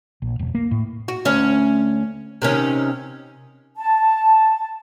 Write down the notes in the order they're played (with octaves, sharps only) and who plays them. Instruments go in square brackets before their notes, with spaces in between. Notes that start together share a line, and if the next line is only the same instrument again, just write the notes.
[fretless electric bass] A#1
E1
A#3
A2
[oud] F#4
D2 C#4
C3 D#3 C#4
[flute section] A5